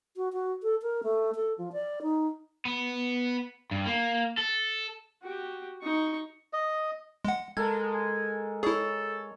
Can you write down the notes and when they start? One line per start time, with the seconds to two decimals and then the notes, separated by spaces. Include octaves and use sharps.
0.16 F#4
0.33 F#4
0.63 A4
0.82 A#4
1.03 A3
1.35 A4
1.58 F3
1.72 D5
2.02 D#4
2.65 B3
3.71 G2
3.86 A#3
4.38 A4
5.22 F#4 G4
5.82 D#4 C#6
6.53 D#5
7.25 G#3 F#5
7.57 G#3 A4 A#4 A5 G#6
7.94 G#5
8.63 E4 G#4 A4 C#5